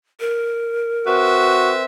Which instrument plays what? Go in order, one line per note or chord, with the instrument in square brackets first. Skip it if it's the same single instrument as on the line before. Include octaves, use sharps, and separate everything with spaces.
[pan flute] A#4
[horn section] C4 B4 E5 [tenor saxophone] F#4